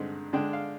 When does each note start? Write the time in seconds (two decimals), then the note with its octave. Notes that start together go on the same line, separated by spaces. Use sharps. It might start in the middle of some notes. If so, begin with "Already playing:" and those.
Already playing: G2 D3 G#3 C4 D#4
0.33 D3 G#3 D4 G5
0.53 F5